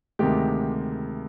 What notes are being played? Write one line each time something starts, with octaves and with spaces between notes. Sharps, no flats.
D2 C3 D#3 G#3 G4